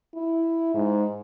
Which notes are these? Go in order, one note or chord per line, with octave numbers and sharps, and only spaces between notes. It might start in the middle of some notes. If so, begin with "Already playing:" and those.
E4
G#2